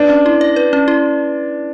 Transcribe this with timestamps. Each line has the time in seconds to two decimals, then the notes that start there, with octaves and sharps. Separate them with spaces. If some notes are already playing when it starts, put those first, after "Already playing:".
Already playing: D4 B4
0.10 C#4
0.26 E4
0.41 D5
0.56 B4
0.73 C#4
0.88 E4